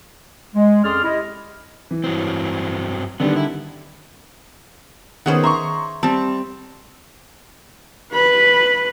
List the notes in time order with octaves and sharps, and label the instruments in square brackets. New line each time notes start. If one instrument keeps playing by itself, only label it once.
[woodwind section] G#3
F2 C#4 G#4 D5 C6 F6
C3 E4 D#5
[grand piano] E3
[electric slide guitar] G2 F#3 C4
[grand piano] D3 D#3 G3 [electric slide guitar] B3 D4
[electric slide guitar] E4
[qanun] D#3 G#4 C5 [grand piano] B3 C#4 F#5
[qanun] E5 [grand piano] A#5 C6 C#6
[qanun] G3 C4 [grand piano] A5
[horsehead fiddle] B4 B5